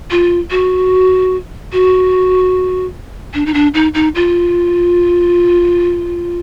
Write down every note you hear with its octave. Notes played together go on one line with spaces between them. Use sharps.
F4
F#4
F#4
D4
D#4
D4
D#4
D#4
F4